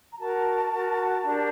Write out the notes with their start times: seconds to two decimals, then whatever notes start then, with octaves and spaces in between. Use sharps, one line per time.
0.12 A#5
0.18 F#4 A#4 A5
0.71 F#4 A#4
1.24 D4 G4 A#4